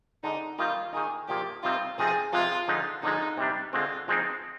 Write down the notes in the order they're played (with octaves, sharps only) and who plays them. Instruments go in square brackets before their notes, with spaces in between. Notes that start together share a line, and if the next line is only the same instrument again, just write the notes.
[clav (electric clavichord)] D3 G#3 D4 [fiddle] D#4
[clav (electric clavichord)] D#3 G3 A#3 D#4 [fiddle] F4
[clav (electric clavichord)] D#3 A#3 D#4 [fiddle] G#4
[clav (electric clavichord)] A#2 F3 A#3 [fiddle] G4
[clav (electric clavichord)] C3 G3 C4 D#4 [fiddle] F4
[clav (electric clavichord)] C3 F3 C4 D#4 [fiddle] G#4
[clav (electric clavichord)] C3 F3 G#3 [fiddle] F4
[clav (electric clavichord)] D3 F3 G#3 D#4
[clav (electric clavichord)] D3 F3 G#3 [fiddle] D#4
[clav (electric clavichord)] C3 G3 D4
[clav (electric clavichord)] D3 G#3 C4 [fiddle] F4
[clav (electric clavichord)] F3 G#3 C4 D#4